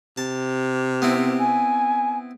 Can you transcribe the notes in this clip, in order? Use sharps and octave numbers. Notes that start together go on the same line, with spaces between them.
C3 A5
B3 C4 E4
G#5